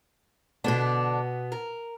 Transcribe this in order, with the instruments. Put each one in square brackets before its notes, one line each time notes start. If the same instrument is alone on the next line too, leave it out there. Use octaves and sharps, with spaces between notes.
[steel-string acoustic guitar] B2 B3 [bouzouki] D3 D4
[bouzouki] A#4